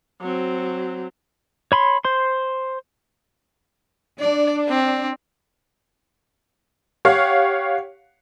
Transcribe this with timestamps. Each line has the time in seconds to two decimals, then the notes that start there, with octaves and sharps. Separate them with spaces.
0.21 F#3 C4
1.72 C#5 B5 C6
2.05 C5 C6
4.20 D4 D5
4.69 C4
7.05 G4 C#5 F5 F#5